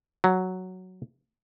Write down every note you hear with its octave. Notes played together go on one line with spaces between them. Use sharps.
F#3